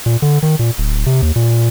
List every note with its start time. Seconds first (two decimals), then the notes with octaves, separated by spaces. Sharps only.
0.06 A#2
0.22 D3
0.43 D#3
0.59 A#2
0.78 D1
1.06 C3
1.22 D#2
1.36 A#2